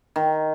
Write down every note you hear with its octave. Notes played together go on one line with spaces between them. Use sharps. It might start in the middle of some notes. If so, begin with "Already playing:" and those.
D#3